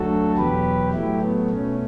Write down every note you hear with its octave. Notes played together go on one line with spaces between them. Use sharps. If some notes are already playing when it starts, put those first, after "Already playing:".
Already playing: D2 D3 F#3 A3 F#4 A4
E2 B2 F#3 G4 B4
A2 F#3 A3 E4 G4
B3
B2 A3 C#4